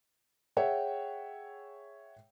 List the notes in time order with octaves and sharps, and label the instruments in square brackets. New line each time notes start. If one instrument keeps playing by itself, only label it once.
[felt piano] G#4 C#5 E5 F#5 G5